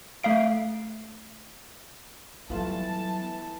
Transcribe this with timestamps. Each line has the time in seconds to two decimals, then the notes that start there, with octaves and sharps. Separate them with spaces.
0.24 A3 E5 F5 D7
2.50 E3 F#3 G3 A3 B3 F4 A5